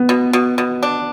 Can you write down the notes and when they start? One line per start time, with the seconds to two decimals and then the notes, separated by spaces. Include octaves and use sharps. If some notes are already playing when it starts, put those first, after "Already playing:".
Already playing: B3
0.09 B2
0.33 B2
0.58 B2
0.83 D4